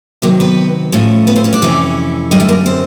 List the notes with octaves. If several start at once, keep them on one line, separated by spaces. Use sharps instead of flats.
C3 D#3 F#3 A#3 A#4
B3 B4
A2 F3 A3 C#4
B3 B4
C4 C5
C#4 C#5
D4 D5
F2 C3 E3 A3 C#4
F#2 D3 G3 D#4 D#5
A3 A4
A#3 A#4
C4 C5